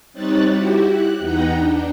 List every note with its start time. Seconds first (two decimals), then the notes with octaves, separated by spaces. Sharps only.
0.13 G3 C4 D#4 C#5 F#6 A6
0.48 E4 F#4 G4
0.86 F#6
1.19 E2 B3 D#4 F#5 G5 A#5
1.55 D4